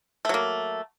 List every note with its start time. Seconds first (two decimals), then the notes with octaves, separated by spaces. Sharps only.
0.25 A3
0.29 F#3
0.34 A#3